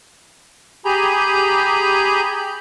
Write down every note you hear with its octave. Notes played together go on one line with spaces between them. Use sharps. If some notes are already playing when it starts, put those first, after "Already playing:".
G4 G#4 G#5 A#5 B5 G6